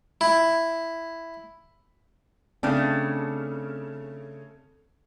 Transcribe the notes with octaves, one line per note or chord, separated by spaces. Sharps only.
E4
C#3 A3 C4 D4